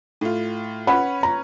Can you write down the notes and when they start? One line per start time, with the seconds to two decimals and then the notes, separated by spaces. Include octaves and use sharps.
0.21 A2 F4
0.87 C#4 B4 C#5 F#5 B5
1.23 A#5